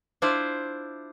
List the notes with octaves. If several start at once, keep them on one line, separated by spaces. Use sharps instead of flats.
D4 E4 F4 C5 D5